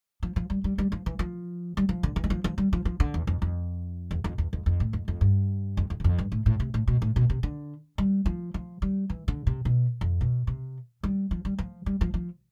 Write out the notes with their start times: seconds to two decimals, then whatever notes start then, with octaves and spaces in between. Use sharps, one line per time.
0.23 F3
0.36 F3
0.50 G3
0.64 G3
0.78 G3
0.92 F3
1.06 E3
1.19 F3
1.77 G3
1.89 F3
2.03 D3
2.16 E3
2.24 G3
2.30 F3
2.44 F3
2.58 G3
2.73 F3
2.85 F3
3.00 D3
3.14 E2
3.27 F2
3.42 F2
4.11 E2
4.24 F2
4.38 E2
4.53 F2
4.66 F2
4.80 A2
4.93 F2
5.08 F2
5.21 G2
5.77 F2
5.90 F2
6.00 E2
6.04 F2
6.18 G2
6.32 A2
6.46 A2
6.60 C3
6.74 A2
6.87 B2
7.02 A2
7.16 B2
7.30 C3
7.43 D3
7.98 G3
8.26 F3
8.54 F3
8.82 G3
9.10 E3
9.28 D3
9.47 C3
9.65 B2
10.01 F2
10.21 B2
10.47 C3
11.03 G3
11.31 F3
11.45 G3
11.58 F3
11.86 G3
12.01 F3
12.14 F3